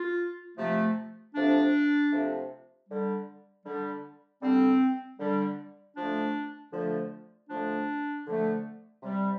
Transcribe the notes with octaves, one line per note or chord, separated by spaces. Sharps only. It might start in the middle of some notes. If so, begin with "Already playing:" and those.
Already playing: F4
C3 F3 A3
C3 F3 A3 D4
C3 F3 A3
D3 G3
D3 G3
D3 G3 C4
D3 G3
D3 F3 A3 D4
D3 F3 A3
D3 F3 A3 D4
D3 F3 A3
C3 G3